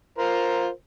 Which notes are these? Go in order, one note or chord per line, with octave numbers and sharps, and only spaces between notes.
F4 A#4 C5